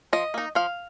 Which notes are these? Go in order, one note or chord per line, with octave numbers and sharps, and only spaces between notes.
F3 D#5
A#3 D#4
F3 F5